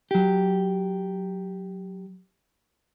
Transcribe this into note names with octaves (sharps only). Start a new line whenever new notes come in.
F#3 G4